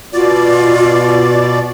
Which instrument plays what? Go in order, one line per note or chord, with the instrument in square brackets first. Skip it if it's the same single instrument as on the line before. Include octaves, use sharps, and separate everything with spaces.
[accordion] B2 D5 [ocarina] F4